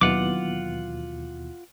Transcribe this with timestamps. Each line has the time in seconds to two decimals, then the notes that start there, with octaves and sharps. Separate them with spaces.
0.01 D#2 B2 E3 F#3 D4 F4 F#5 D6